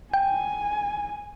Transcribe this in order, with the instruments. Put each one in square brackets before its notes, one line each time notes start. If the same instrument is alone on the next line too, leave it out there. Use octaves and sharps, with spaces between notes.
[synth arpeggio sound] G5 [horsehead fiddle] G#5